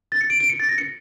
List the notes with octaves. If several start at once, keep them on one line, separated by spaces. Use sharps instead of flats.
A6
C#7
D7
D7
C#7
A6
A#6
C#7